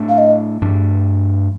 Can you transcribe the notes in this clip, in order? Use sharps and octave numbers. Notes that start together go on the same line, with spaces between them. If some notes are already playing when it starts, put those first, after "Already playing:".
Already playing: A2 A3 D4
F5
D#5
G2 F3 A3 D4